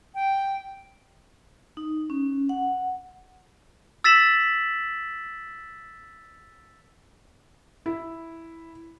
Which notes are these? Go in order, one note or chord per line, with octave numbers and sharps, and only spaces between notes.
G5
D#4
C#4
F#5
E6 A6 B6 E7 F#7
E4